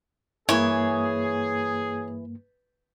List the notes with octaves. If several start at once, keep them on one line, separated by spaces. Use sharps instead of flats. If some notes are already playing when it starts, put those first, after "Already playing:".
G2 E3 A#3 G#4 C#5